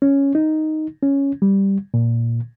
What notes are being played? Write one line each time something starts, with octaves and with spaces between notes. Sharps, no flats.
C#4
D#4
C#4
G3
A#2